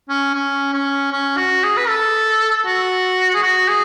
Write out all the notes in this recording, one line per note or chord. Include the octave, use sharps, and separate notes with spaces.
C#4
C#4
C#4
C#4
F#4
G#4
B4
A4
F#4
G#4
F#4
G#4